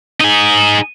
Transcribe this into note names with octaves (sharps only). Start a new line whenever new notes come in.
D#4 G#4